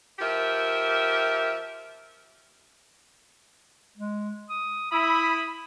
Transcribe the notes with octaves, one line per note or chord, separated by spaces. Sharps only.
F3 G4 A#4 E5
G#3
D#6
E4 B5 D#6